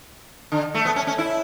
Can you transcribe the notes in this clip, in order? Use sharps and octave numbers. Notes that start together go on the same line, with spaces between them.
D3
A3
B3
C#4
C#4
E4